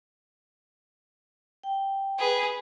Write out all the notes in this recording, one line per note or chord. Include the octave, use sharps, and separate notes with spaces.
G5
G#4 B4